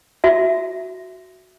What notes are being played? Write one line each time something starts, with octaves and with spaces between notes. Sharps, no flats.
F#4 E5